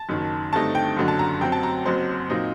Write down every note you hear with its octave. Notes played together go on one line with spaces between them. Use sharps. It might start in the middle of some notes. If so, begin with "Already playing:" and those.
Already playing: A5
F#1 F#2 D#3
G2 D3 A3 C4 D#4 A5
G5
F#1 F#2 D3 F#3
A5
A#5
F#2 F#3 C4 G5
A5
A#5
F#1 F#2 F#3 C4 C5
A#2 F#3 C4 D#4